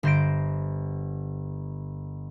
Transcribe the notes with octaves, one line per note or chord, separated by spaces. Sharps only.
G1 C5 A#6 D7